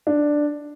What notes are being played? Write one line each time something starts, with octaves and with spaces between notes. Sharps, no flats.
D4